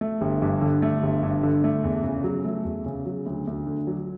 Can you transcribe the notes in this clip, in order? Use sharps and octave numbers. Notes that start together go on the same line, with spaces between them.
A3
G1
G2
D3
A3
G1
G2
D3
A3
E2
C#3
F#3
A3
E2
C#3
F#3
D2
D2
D3
F#3